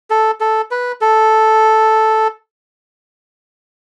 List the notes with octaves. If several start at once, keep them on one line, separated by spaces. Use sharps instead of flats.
A4
A4
B4
A4